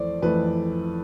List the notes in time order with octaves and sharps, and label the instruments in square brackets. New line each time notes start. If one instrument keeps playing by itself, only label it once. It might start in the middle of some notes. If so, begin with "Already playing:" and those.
Already playing: [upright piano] F2 E3 A3 C5 D5
F2 E3 A3 B4